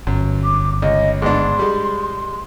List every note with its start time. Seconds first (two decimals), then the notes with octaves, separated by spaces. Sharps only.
0.07 G1 F#2
0.44 D6
0.82 C#2 D#5
1.22 G#2 B3 D4 C6
1.59 G3 G#3